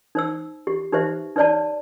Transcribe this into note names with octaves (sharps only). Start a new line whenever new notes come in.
D#4 C5 E6
G4
D#4 G4 B4 C5 E5
D#4 B4 C#5 D5 A5